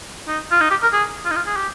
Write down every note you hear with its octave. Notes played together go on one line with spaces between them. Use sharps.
D#4
F4
D#4
G4
A#4
G#4
F4
D#4
F4
G#4
G4